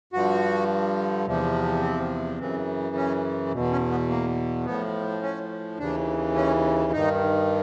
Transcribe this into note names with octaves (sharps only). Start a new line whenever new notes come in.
G2 D3 F3 F#4
E2 C3 F3
C4
F#2 C#3 E3 C4
C#4
E2 B2
C#4
B3
A#3
A2 F3 B3
C#4
D#2 C#3 E3 D4
C#4
G2 D#3 D#4